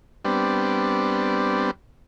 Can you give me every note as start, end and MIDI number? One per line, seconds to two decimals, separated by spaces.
0.25 1.71 55
0.25 1.71 59
0.25 1.71 60
0.25 1.71 62